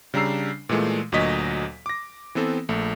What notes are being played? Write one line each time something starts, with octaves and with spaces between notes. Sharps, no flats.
C#3 G3 D4 A#5 E6 C7
A#2 E3 G#3 A3
D2 A#2 F#3 C#5 D#5 B6
D6 A#6
E3 B3 C4 A4
A#1 A3